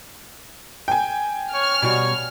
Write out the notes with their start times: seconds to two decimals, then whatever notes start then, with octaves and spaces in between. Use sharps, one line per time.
0.88 G5 G#5
1.54 C#5 F6
1.82 B2 G3 F#4 C#5